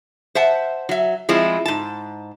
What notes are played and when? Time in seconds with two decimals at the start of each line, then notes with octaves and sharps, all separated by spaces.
0.35 C5 E5 F#5 A5
0.89 F#3 E5
1.29 F3 G#3 C4 E4
1.65 G#2 A5